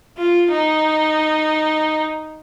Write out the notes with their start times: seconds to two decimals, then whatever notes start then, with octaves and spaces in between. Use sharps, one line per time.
0.18 F4
0.51 D#4